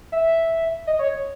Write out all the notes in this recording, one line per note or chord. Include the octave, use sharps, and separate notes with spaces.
E5
D#5
C#5